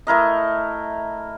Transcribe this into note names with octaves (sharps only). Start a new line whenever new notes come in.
A3 E4 A#4 D#5